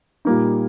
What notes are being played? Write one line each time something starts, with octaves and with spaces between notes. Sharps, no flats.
A#2 G3 A#3 D#4